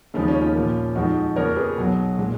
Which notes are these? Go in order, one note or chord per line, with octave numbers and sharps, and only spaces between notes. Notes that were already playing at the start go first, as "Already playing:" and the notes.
D#2 C#3 F3 G#3 D#4
C#4
C#4 F4
A#1 A#2 F3 A#3
F2 F3 G#3 D#4 F#4
F2 C#3 F3 A#3 A#4 C#5
G#4 B4
B1 B2 F#3
A#2 G#3